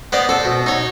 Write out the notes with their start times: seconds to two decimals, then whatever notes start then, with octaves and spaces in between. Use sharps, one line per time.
0.12 B3 C5 D5 D#5
0.29 A4 C5
0.45 B2
0.66 D#4 C#5